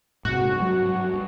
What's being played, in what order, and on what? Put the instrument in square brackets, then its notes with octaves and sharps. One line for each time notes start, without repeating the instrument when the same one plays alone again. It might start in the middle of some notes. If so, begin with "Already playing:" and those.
[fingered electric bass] G#2 C3 G#3 [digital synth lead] F#4
[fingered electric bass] G2 F#3
G2